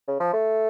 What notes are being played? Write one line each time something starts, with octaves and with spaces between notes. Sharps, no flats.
C#3
F3
A3